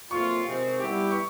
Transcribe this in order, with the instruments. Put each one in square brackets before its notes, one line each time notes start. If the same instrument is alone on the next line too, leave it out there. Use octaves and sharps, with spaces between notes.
[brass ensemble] A#2 F#3 A3 C4 F4 [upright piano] C#6
[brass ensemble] C3 D#3 G#3 C4
G3 B3 E4 G4
[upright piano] C#6